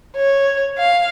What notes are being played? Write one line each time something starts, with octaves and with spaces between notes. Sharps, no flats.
C#5
F5